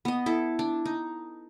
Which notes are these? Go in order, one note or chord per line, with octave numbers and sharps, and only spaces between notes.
B3 D#5
E4 A4
D4
D#4